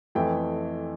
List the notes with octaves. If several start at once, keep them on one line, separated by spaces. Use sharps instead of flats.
F2 E3 A3 G5